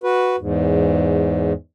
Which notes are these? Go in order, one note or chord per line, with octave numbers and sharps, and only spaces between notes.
F#4 B4
E2 G#2